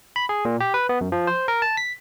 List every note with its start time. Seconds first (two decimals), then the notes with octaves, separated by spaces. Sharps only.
0.16 B5
0.29 G#4
0.45 A#2
0.60 G4
0.74 B4
0.89 B3
1.01 F#2
1.12 F3
1.27 C5
1.48 A#4
1.62 A5
1.77 B6